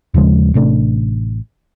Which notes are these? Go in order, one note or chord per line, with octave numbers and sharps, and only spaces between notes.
D#2 C#3 F3 G#3
A1 C3 A3 D4